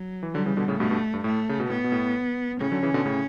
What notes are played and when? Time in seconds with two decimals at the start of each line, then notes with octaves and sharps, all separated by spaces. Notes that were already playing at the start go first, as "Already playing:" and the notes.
Already playing: F#3
0.23 E3
0.34 D3 F#3 G3
0.46 C#3 E3
0.57 B2 D3
0.68 A2 C#3
0.80 G2 B2 A3
0.90 G2 B2
1.14 G2
1.24 A2 A3
1.49 C#3
1.60 B2
1.70 A2 B3
1.84 B2
1.92 A2
2.60 A2 C#3 C#4
2.72 D3 F#3
2.83 C#3 E3
2.94 B2 D3
3.06 A2 C#3